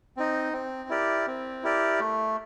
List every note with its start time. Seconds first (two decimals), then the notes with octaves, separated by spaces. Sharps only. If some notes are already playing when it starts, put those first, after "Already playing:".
0.17 C4 D#4
0.53 C4
0.89 E4 G4 A#4 D5
1.27 C4
1.63 E4 G4 A#4 D5
2.00 A3